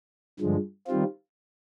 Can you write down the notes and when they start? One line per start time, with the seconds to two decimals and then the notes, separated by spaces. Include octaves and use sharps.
0.39 G2 D3 F3 G#3
0.87 D#3 G3 C4 F4